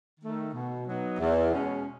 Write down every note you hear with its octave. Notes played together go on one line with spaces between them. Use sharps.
D#3 A3
B2
F#3 B3 D#4
E2
B2 G#3 C#4